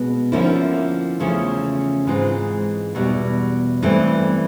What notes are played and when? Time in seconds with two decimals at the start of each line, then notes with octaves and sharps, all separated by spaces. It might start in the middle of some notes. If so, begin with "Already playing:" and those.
Already playing: B2 G#3 B3
0.32 D3 F3 A#3 C#4 E4
1.20 E2 C#3 F3 A3 C#4
2.07 G#2 E3 G#3 C4 F4
2.95 E2 B2 G3
3.83 G2 E3 A3 C4